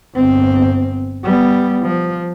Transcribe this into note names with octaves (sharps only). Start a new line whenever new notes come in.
G1 C4
G3 B3
F3